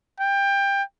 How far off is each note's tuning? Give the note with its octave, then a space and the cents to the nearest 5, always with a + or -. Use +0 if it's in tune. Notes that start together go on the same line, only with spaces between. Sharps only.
G5 +20